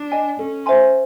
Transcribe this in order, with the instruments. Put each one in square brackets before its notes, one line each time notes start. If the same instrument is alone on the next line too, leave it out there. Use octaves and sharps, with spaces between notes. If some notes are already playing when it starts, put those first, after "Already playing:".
Already playing: [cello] D4
[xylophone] D#5 G#5
[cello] C#4 [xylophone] A4
[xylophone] C5 E5 G#5 C6